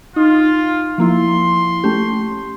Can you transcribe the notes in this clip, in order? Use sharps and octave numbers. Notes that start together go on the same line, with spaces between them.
D#4 F4
F3 A#3 E4 C6
A3 C#4 G4